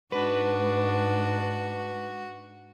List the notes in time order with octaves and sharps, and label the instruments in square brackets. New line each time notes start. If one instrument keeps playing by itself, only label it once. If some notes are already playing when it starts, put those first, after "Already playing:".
[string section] G#2 [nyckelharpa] D4 [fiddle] F#4 [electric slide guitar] B4